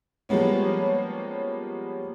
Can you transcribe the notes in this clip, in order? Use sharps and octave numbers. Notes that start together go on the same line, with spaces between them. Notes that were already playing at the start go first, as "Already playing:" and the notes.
F3 G3 G#3 A#3 B3 C#4